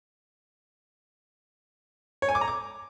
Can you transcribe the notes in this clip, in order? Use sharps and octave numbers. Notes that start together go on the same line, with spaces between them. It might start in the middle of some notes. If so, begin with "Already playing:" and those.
C#5
G#5
D6
A#5
D6